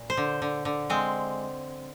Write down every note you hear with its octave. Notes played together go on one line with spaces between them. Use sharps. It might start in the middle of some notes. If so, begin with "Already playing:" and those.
Already playing: A#2
C5
D3
D3
D3
G#3 C4